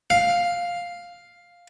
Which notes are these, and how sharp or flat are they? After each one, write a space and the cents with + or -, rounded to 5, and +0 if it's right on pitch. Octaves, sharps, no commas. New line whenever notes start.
F5 +5